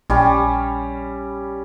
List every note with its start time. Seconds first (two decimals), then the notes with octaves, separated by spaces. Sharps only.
0.10 A#1 G3 C#4